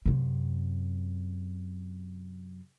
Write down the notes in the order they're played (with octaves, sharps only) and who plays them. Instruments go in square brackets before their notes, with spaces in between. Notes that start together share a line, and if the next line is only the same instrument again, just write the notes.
[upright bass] F#2 C3